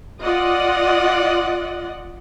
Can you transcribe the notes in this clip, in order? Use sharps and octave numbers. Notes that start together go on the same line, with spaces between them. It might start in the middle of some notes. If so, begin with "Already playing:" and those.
F4 D5 D#5 F#5